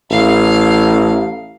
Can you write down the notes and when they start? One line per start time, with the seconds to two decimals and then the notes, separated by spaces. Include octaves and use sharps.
0.11 A1 F5